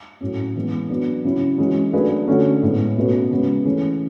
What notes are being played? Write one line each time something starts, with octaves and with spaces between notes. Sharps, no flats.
A2 F#3 C#4
E3 G#3 B3
F#3 B3 D4
C#3 F#3 C#4 E4
E3 G#3 C#4 F#4
F#3 A3 D4 G#4 B4
D3 A3 C#4 F#4
A2 G#3 B3
B2 A3 C#4 F#4 B4
C#3 G#3 B3 F#4
E3 A3 C#4 G#4